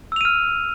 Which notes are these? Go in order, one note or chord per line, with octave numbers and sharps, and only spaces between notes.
E6 F6 D#7 F7